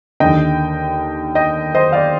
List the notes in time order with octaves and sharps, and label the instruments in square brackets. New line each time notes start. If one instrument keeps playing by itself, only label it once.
[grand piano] D#2 D3 D#5 G5
D#5 G5
C5 D#5
D5 F5